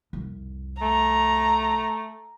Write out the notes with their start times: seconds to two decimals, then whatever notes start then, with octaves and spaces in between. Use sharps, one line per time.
0.13 C2 F2
0.82 A3 A#5